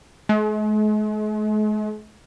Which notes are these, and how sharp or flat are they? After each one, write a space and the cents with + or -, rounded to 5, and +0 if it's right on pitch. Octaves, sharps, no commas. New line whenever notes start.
G#3 +45